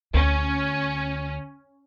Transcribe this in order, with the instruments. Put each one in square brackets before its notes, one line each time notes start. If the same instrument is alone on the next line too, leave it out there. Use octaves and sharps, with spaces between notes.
[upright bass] D2 [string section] C#4